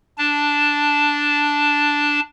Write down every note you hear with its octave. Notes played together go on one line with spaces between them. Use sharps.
D4 A5